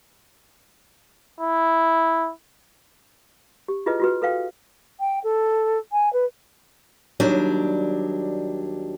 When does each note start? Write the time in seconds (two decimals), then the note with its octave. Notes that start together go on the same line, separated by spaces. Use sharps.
1.40 E4
3.68 G4
3.86 E4 F4 G#4 B4 D#5
4.00 F4 F#4 B4
4.22 A4 B4 F5 G5
5.00 G5
5.24 A4
5.92 G#5
6.13 B4
7.20 D#2 F#3 G3 D4